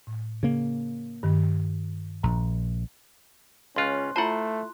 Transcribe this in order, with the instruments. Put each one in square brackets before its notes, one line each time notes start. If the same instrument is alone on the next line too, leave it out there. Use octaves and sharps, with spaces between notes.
[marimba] A2
[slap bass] C#3 A#3
[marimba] G2 D#3
[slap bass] A#1 [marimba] A#5
[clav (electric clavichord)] C#2 F4 [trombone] C#4 [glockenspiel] C6 F#6
[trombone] A3 [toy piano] E4 F4 A5 [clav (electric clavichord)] C5 F#5